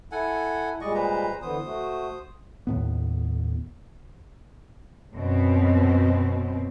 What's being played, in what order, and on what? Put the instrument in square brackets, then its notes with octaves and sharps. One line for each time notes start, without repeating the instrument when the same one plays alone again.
[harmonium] E4 [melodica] A4 F#5 G#5
[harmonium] A#2 G3 G#3 [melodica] D5 D#5 C#6
[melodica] B4 C5 A#5
[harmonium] D3 E3 B3 [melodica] C5 D#6
[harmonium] A3 F#4
[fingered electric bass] D#2 A2 B3
[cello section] F#2 B2 C4